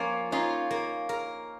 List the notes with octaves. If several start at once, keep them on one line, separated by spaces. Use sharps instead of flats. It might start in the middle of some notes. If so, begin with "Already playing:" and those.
Already playing: F3 A#3 C#4 F4
C#4 D#4 F4
A#3
A#4